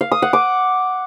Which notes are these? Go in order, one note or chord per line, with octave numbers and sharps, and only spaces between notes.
F5
D#6
F#5
D6